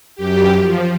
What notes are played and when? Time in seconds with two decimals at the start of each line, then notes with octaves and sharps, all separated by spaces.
0.16 F#2 G4
0.59 F3